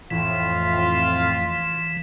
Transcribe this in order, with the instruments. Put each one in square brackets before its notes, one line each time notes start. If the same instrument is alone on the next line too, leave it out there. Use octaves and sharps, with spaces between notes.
[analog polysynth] F2 A2 [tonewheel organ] E3 [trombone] F4